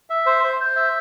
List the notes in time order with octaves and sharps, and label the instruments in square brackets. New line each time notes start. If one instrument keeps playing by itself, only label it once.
[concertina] E5
C5
C5
C5
E5